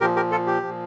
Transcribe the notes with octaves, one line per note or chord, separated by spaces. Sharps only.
A#2 F3 G4 A#4
G4 A#4
F4 A4
G4
A#2 F3